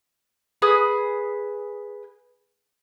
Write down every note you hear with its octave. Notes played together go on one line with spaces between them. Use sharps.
G#4 B4 D#6